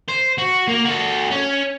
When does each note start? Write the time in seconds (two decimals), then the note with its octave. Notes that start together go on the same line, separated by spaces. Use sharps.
0.08 C5
0.38 F#4
0.68 A#3
0.85 F#4 A4
1.31 C#4